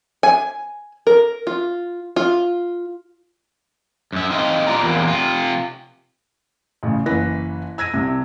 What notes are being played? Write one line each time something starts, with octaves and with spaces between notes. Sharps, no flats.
G#5
A#4
F4
F4
F#2 E5
C4 D#4 C5 D#5 F5
F4 G4 D5 A#5
E2 C3 E3 A#3
C3 F4
A1 C#3
F#1 E3 B4 A#6
E6 G#6 A#6 D#7
C2 C3